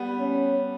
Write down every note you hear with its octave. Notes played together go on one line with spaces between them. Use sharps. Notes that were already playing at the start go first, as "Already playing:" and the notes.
Already playing: G3 B3
C#4